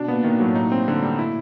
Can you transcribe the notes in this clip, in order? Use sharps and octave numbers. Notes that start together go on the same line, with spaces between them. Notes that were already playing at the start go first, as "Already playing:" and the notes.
Already playing: B2 D4
A#2 B3
A#2 D#3
A2 F#3
D#4
C4
D3
G3
E4